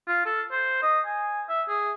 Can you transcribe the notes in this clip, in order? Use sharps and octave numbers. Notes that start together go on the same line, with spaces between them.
F4
A4
C5
D#5
G#5
E5
G#4